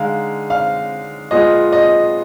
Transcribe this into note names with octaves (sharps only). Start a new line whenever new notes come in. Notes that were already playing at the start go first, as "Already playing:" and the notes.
Already playing: D3 G#3 D#4 F5
F5
A#2 G#3 B3 F4 G#4 D#5
D#5